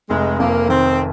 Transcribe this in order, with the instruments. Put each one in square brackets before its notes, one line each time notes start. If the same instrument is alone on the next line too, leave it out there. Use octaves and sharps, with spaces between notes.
[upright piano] F1 [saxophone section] G#3
[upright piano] F2 [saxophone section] A#3
[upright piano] D#3 [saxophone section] C4